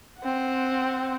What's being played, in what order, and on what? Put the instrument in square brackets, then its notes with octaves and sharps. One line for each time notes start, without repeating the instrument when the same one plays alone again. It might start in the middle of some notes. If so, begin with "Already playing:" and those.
[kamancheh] C4 F#5